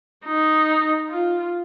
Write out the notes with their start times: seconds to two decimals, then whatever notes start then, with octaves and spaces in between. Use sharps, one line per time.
0.25 D#4
1.09 F4